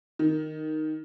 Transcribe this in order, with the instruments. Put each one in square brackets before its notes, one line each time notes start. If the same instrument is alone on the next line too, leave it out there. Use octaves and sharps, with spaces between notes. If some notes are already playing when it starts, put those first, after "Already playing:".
[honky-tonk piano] D#3